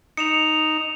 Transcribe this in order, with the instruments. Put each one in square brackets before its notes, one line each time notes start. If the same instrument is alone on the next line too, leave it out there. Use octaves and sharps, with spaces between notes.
[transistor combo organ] D#4 [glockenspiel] C#7 E7 F7